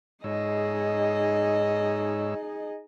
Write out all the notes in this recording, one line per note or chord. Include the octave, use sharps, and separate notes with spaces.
G#2 D#4 G#4 C#5 D#5 E6